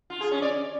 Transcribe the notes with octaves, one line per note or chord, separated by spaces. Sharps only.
F4
G#4
C#4
D5